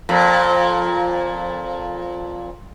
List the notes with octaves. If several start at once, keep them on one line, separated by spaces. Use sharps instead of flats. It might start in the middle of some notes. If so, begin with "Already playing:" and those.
F2 A#2